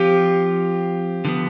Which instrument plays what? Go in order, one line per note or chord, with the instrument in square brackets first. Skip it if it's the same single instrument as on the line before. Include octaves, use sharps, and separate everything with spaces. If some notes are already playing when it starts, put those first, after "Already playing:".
Already playing: [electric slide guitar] F3 C4 F4 [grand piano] G4
[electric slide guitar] D3 F3 B3